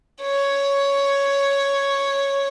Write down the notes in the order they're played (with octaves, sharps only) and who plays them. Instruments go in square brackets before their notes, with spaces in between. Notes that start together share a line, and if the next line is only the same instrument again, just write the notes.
[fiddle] C#5